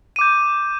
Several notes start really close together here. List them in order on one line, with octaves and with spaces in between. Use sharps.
D#7 D6 G6